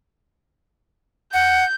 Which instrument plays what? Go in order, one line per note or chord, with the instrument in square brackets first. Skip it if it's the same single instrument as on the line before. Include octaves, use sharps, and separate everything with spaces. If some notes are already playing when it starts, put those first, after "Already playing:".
[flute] F#5 [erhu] G6